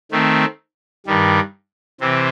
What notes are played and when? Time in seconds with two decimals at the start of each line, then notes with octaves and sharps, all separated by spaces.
0.12 D#3 A3 C4
1.06 G2 D#3 G3
2.01 C3 E3 C4